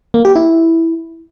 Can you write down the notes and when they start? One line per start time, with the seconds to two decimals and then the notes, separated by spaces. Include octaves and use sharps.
0.14 A#3
0.25 G4
0.35 E4